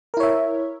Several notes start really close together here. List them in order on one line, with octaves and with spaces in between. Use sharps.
A#4 E4 C#5 E5